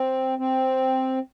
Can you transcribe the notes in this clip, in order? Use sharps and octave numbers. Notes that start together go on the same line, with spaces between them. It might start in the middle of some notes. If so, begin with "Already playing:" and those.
Already playing: C4
C4